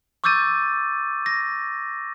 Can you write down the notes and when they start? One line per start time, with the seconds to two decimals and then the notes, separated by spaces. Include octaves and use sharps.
0.24 C#6 D6 E6 G6 A6 D#7
1.26 A#6